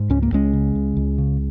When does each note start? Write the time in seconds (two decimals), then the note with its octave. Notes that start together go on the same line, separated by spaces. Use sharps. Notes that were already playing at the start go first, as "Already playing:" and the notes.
Already playing: G#2
0.10 C#2 C#4
0.23 A#3
0.32 C#2 G#3 C#4
0.53 C#3
0.75 C#2
0.97 C#2
1.18 C#3